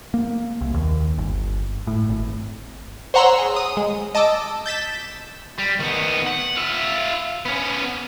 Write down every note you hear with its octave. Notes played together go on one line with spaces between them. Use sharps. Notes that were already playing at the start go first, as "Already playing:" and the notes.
A#3
C2
D#2
G1
A2
G#1
C5 C#5 F#5 A#5 C6 E6
G#4
D#6
G#3
D#5 A5 D6 E6
G6 A6 B6 E7
G3
D#3 B3
F#5
F4 E5
B3 C#4